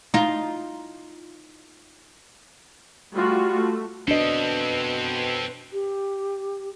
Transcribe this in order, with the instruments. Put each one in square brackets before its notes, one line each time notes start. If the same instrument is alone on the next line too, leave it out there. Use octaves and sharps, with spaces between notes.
[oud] D#4 F4
[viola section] G3 A3 F4 F#4
A3
[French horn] B2 [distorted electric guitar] C4 A4 [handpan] D4 D#5 [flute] B4
[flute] G4